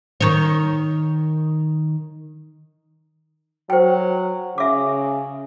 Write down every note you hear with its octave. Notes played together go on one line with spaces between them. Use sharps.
D#3 C#5
F#3 C5 G5
C#3 E5 D6